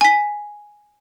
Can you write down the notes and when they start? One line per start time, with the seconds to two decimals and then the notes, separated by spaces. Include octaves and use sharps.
0.01 G#5 B6